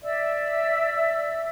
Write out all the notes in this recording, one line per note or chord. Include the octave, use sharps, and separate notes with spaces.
D5 E5 E6